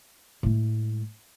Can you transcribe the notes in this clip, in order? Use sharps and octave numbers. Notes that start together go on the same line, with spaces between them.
A2 G#3